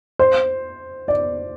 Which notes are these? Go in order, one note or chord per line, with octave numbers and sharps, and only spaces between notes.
C5
D5